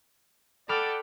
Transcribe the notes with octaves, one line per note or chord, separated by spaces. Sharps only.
A4 D5 F#5 G5 B5 D6 F6